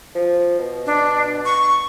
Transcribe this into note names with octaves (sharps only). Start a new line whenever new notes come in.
F3
B2
D4
C#6